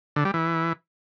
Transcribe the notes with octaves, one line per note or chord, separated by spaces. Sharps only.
D3
G3
E3